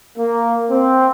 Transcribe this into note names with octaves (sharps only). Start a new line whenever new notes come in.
A#3
C4